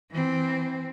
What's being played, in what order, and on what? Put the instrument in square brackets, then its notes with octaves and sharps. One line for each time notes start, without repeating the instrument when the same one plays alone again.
[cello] E3 C4